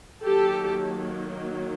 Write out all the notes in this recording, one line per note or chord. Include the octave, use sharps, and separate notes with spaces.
D#3 F#3 A#3 G4 A4